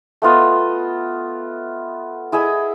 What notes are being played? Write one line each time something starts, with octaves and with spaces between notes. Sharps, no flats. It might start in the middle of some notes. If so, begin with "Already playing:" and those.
A3 B3 F4 D#5
E4 G#4 D#5 E5